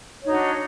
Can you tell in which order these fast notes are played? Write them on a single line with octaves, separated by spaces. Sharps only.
C#5 D#4 F#4 D4